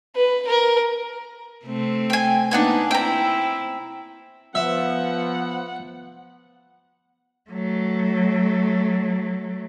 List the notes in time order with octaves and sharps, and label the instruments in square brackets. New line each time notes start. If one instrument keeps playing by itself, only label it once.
[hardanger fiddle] B4
A#4
[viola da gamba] C3 A3 C4
[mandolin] G5 G#5
[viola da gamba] A#3 B3 D#4 [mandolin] D4 F#5 G#5
[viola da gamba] C4 E4 [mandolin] G5 A#5
[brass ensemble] F3 B3 [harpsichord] E5 [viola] F#5
[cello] F#3 A3